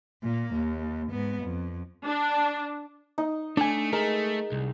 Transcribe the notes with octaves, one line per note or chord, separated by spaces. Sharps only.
A#2 A#3
D#2
G#2 B3
F2
D4
D#4
A3 D4 G#5
G#3 A3 A#4
C2